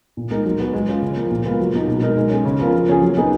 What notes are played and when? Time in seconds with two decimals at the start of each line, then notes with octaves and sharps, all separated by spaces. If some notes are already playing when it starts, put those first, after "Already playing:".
0.17 A#2
0.30 G#3 D#4 A#4
0.45 F#3
0.59 B3 F#4 B4
0.73 G#3
0.88 C#4 F4
1.02 C#3
1.16 F3 A#3
1.31 A#2
1.45 G#3 B3 F4 A#4
1.60 F#3
1.74 A#3 D#4
1.88 B2
2.02 G#3 D#4 A#4
2.17 G#3
2.30 C#4 G#4
2.45 C#3
2.59 F3 B3 F4 A#4
2.73 F3
2.88 A#3 C#4 F4 G#4
3.02 F#3
3.17 A#3 D#4 G#4 B4